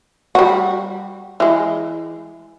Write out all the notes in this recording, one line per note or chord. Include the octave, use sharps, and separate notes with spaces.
G3 F#4
E3 G#3